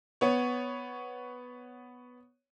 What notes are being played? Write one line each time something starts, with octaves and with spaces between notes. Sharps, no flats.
B3 C#5